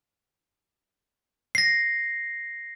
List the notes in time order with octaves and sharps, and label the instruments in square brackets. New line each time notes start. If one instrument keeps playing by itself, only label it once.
[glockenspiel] A#6 C7